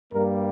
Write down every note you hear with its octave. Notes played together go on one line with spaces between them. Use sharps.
G2 G3 A#3 A#4